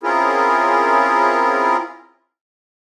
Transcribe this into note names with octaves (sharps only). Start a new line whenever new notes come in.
C4 C#4 E4 F4 G#4 A#4